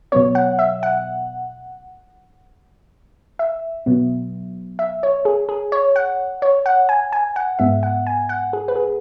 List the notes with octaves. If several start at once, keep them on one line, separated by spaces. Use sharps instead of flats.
B2 F#3 B3 C#5
F#5
E5
F#5
E5
B2 F#3 B3
E5
C#5
G#4
G#4
C#5
F#5
C#5
F#5
G#5
G#5
F#5
G#2 G#3 B3 E5
F#5
G#5
F#5
G#4
B4
G#4